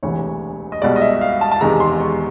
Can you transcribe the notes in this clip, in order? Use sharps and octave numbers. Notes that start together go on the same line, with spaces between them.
E1 D2 C3 E3 C#5
D#5
C2 B2 G#3 D5
D#5
E5
F5
A5
A5
E1 E2 C3 D#3 G#3 A#5
C6
C#6